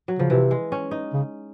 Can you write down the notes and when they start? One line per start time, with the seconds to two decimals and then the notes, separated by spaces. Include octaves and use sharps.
0.08 F#3
0.19 C#3 F3
0.30 C3 E3
0.51 G#3
0.72 C#4
0.91 D#4
1.13 C#3